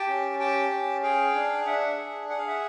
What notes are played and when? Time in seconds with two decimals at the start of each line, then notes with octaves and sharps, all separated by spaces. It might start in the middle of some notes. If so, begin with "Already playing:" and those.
Already playing: G4 G5 A5
0.08 C#4
0.40 G4 G5 A5
0.71 C#4
1.03 G#4 F5 G5
1.34 D4
1.61 F5
1.66 D4 E5 F#5
1.98 G#4
2.29 G#4 F#5
2.38 F5
2.47 E5 F#5